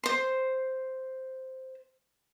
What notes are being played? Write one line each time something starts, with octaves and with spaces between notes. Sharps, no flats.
C5 C6